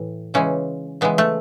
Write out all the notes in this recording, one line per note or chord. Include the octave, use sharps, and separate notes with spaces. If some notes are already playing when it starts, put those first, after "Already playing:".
Already playing: A2 E3
C#3 E3 G#3 C#4
C#3 E3 G#3 B3
A3